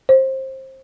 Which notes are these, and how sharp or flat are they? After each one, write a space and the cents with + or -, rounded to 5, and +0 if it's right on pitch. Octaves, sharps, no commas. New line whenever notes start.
C5 +25